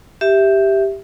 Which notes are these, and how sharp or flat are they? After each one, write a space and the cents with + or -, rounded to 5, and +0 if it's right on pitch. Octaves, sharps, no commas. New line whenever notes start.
G4 +0 E5 +0